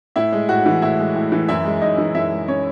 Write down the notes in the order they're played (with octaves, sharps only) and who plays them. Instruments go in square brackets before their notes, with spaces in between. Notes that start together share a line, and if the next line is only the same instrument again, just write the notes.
[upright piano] A2 E4 E5
G#3
A2 F#4 F#5
E3
A2 E4 E5
G#3
A2
E3
F#2 E4 E5
G#3
F#2 D#4 D#5
E3
F#2 E4 E5
G#3
C#4 C#5